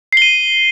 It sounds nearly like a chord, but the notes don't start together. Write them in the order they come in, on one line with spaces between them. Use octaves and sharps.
C7 G7 D#7